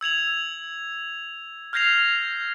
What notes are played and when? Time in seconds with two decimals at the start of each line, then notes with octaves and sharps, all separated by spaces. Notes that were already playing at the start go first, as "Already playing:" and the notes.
0.01 E6 G#6 F7 F#7
1.73 F6 G6 G#6 A#6 C7 F7